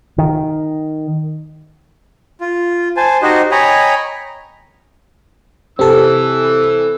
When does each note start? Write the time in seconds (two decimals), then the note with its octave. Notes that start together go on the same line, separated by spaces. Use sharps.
0.18 D#3
2.41 F4
2.97 C5 G#5 A5
3.22 D#4 F#4 G4 C5 D#5
3.51 C#5 D#5 G5 G#5 A#5 B5
5.79 C3 E3 C4 A4 E6